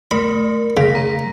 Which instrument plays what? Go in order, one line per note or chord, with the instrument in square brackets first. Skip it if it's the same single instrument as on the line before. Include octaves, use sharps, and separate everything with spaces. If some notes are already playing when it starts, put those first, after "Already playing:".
[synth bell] A3 A#4 [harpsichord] B5
[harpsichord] C#3 [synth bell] A#6 B6
[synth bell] A#5